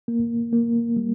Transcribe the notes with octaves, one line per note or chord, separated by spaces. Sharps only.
A#3
A#3
G3